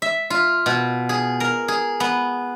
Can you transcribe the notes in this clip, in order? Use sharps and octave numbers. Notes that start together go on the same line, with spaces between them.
E5
F4
B2
G#4
A#4
G#4
B3